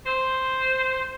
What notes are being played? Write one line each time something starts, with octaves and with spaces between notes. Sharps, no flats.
C5